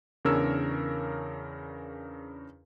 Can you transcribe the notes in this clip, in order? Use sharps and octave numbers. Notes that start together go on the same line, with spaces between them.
E2 C#3 D4 A#4 C#5 E6